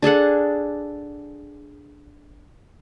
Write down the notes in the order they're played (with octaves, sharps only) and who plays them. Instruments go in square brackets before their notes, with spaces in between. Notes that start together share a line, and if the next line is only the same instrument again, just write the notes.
[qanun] D4 G#4 A4 F#5